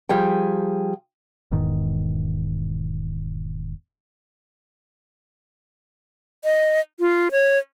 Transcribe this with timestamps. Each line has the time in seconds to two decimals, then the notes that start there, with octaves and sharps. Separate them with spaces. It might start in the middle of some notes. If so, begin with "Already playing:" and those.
0.09 F3 G3 G#4 G5
1.51 E1 E2 G#2 D#3
6.44 D#5
7.00 F4
7.31 C#5